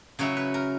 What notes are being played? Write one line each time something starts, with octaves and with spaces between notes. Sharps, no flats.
C#3 F#3 C#4 E4 C#5
B4
A#4